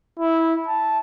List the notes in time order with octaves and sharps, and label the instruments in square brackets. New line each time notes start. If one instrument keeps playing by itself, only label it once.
[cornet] E4
A5